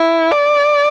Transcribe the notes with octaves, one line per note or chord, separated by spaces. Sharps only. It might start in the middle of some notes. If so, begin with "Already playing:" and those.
Already playing: E4
D5